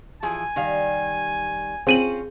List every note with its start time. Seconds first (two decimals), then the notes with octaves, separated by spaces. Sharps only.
0.23 E3 F3 G#4 G#5
0.56 D#3 G3 F5
1.87 C4 C#4 F4 G#4 D#7 F#7